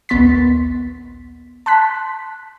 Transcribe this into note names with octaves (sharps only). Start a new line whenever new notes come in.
A#1 D#2 B3 C6 A6 B6
A5 C6 F#6 B6